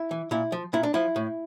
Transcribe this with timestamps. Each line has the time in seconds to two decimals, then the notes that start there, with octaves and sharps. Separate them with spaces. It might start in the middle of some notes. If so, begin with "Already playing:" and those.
Already playing: E4
0.11 E3
0.31 A#2 E4
0.52 F3
0.73 A#2 E4
0.83 D4
0.94 F3 E4
1.16 A2